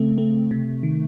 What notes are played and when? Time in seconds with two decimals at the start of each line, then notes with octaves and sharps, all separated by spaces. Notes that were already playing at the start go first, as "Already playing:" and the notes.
Already playing: C#3 A3 C4
0.18 A3
0.51 C3
0.83 D#3